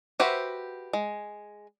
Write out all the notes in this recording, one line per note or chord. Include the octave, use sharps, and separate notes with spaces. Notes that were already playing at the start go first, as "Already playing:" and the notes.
F#4 G4 B4 C5 E5
G#3